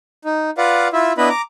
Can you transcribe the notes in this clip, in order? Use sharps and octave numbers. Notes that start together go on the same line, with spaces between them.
D#4
F4 B4 D5 F5 F#5
E4 F4 E5
B3 D4 E4 B4 D#5 B5
A#5 D6